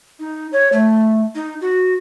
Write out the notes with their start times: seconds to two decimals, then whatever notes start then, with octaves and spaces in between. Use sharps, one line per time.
0.20 D#4
0.53 C#5
0.73 A3
1.35 D#4
1.61 F#4